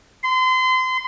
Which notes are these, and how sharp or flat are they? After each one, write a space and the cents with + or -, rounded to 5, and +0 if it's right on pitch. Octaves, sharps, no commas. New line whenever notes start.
C6 -30